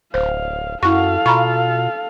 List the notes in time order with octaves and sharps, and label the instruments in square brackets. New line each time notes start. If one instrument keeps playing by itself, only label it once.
[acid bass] D1 [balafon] C5 [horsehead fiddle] F5
[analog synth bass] F#2 [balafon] E4 C#6 [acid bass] F#4 [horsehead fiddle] A4 F5
[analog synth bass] B2 [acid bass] F4 [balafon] A#5 B5 C#6